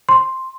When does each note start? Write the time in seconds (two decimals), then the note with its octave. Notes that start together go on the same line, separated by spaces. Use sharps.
0.09 C6